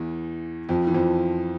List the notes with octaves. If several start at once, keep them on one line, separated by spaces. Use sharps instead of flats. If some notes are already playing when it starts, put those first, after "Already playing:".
Already playing: E2 E3
F2 F3
E3
F2 F3